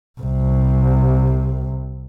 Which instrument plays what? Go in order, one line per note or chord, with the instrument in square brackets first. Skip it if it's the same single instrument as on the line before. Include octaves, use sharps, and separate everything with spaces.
[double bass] C2 C3